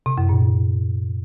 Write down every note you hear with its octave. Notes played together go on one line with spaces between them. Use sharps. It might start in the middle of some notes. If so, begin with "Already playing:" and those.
C3
F#2
A#2